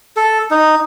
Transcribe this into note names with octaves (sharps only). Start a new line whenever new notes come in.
A4
D#4